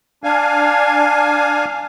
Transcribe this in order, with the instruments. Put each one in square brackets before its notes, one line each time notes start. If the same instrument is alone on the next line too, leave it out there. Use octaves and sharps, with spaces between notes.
[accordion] D4 F5 G#5